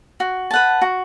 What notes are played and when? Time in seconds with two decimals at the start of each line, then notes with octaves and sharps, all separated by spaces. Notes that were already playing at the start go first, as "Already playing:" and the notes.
0.20 F#4
0.51 B4 F#5 A5
0.82 F#4